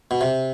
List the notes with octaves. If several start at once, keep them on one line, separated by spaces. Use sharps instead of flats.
B2
C3